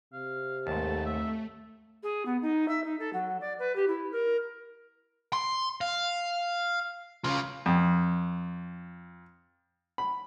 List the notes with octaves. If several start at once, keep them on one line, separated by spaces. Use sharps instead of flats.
C3 F5
D#2 G#2 A3 A5
E5
G#4
B3
D#4
E5
D#4
A4
F#3
D5
B4
G4
E4
A#4
C6
F5
C#3 F4
F2
B5